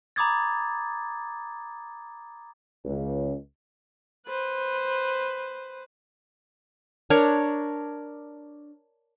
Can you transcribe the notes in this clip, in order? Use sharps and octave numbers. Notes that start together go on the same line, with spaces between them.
A#5 B5 D6 D#6 G#6 A6
C#2
B4 C5
D4 A#4 C#5